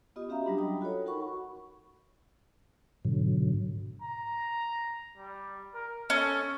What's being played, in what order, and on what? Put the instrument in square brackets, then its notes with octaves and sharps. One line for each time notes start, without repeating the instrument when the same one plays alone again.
[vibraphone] B3 F4 G4 D#5 D#6
C#4 F#4 G4 E5 F5 A#5
F#3 G3 D4 B5
D#5 G5 A#5 B5 D#6
F4 F#4 A4 C#5
D#4 F#4 A#4 F#5 B5 C#6
[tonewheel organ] G#2 B2 D3 F#3
[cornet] A#5
G3
A#4
[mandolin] C#4 [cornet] A4